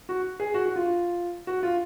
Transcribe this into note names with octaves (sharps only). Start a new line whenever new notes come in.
F#4
G#4
F#4
F#4
F4
F#4
F4